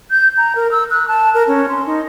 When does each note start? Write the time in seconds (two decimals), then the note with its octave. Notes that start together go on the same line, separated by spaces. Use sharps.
0.11 G6
0.37 A#5
0.56 A#4
0.71 E6
0.91 F#6
1.08 A5
1.34 A#4
1.48 C#4
1.69 C6
1.86 D#4